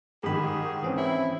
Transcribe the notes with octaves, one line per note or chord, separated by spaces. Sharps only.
G#2 D#3 G4 G#4 B5
E3 C4 C#4
E4